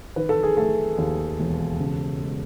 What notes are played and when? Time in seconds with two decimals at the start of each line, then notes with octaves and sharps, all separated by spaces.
0.16 D#3 B4
0.29 A4
0.43 G#4
0.57 A3 A4
0.98 D#2
1.39 E1
1.80 C#3
2.21 G#3